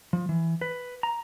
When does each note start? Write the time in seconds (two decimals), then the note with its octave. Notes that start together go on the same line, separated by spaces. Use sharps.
0.13 F3
0.29 E3
0.61 B4
1.03 A#5